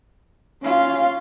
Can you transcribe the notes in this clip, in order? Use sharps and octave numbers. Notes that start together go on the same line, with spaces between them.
C#4 F4